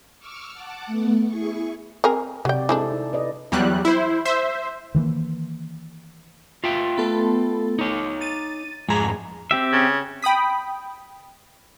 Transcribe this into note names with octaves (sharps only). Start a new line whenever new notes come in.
C#6 D6 E6 F6
F#5 A5 D6
A3 B3
E4 G#4 C#6
C4 G#4 A#4
C3 F#3 G4 D5 G5
G#3 C4 D4 E4 A4 D5
D#4
B4 D5 D#5
E2 F#3 G3 F#6
E4 C5
C5 E5
D#3 E3 G3 A#3
F4 E5 G5
A3 B3 A4
D#4 C#5
A6 D#7
F2 G#2 G#3 G#4 A#5
C4 G4 E5
C#3
G5 B5 D#6 B6